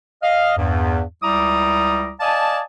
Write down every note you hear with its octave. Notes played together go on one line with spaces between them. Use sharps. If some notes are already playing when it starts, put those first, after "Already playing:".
D#5 F5
E2 G2
C#2 G3 E4 A#5 D6 D#6
D5 D#5 F5 G#5 A5